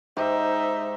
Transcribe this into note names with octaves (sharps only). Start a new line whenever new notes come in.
G#2 D#4 G4 C5 E5